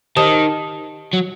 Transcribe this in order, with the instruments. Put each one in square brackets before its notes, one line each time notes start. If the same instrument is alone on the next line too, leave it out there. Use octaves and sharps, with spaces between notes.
[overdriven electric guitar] D#3 [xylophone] G4 C5 D#5 A5 D#6
[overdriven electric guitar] F#3